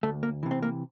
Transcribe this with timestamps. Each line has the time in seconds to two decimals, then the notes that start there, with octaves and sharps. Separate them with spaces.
0.03 D2 A3
0.23 A#3
0.43 C3 E3
0.51 C4
0.63 A#3